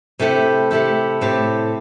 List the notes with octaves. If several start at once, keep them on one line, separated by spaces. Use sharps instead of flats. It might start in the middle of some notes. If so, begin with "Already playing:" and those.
C3 A3 E4 G4
C3 A3 E4 G4
A2 A3 C4 G4